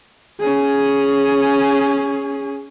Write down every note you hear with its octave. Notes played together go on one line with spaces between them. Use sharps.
C#4 G#4